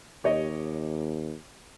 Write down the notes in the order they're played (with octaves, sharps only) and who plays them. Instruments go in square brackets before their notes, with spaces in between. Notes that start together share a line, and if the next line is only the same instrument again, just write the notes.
[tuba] D#2 [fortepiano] G4 C#5 D#5